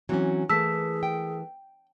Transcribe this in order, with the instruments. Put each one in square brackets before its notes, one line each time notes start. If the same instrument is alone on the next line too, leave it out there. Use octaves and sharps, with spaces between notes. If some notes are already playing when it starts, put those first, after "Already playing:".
[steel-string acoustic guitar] E3 C4 F#4 [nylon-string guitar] F#3 C#4
[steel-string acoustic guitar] E3 A3 A#3 [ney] G#4 [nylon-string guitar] A5 [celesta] E6 B6
[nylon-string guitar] G5